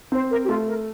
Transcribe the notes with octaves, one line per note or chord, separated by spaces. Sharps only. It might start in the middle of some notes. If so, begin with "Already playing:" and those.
C4 C5
A#4
G4
A3 F4
A#4